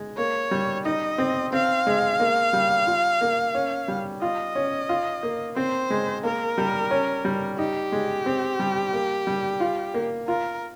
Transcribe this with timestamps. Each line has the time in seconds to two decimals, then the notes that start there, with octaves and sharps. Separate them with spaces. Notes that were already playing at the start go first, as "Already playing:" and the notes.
Already playing: G#3
0.17 A#3 C#5
0.51 G3
0.85 D#4 D#5
1.18 C4
1.53 C4 F5
1.87 G#3
2.20 A#3
2.53 G3
2.87 F4
3.21 A#3
3.55 C#4
3.88 G3
4.22 F4 D#5
4.55 C#4
4.89 F4
5.23 A#3
5.56 C4 C5
5.90 G#3
6.24 A#3 A#4
6.58 G3
6.91 C#4
7.25 G3
7.58 D#4 G4
7.92 G#3
8.26 C4
8.60 G3
8.93 A#3
9.27 G3
9.60 F4
9.94 A#3
10.28 F4 A#4